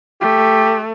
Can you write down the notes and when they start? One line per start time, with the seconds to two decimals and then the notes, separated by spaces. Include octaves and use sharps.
0.21 A3 G4